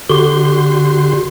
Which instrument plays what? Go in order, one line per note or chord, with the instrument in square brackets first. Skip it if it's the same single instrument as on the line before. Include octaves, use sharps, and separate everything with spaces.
[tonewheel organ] D3 F#4 G4 C6